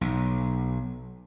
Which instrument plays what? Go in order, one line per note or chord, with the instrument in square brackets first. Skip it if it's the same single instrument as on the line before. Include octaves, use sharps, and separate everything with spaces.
[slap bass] B1